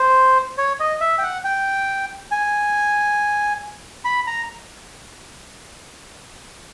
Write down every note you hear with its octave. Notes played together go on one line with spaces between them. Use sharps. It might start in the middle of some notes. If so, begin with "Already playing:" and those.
Already playing: C5
C#5
D#5
E5
G5
F#5
G5
G#5
B5
A#5